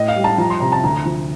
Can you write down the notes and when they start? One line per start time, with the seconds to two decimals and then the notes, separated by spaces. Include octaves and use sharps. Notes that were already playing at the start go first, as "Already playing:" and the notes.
Already playing: A2 D#5
0.08 F5
0.16 G3
0.24 A5
0.38 F3 A#5
0.50 C6
0.60 C3 A#5
0.72 A5
0.83 D2 A#5
1.06 F3